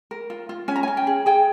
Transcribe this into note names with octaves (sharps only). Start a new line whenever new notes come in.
A#4
F4
F4
C#4 G#5
A#5
C#4 G#5
G5
G#4
G#4 G5